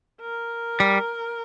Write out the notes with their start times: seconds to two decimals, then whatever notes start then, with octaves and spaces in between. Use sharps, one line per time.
0.21 A#4
0.80 G3